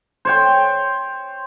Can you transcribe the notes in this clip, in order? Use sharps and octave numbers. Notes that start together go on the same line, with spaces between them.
C5 C#5 G5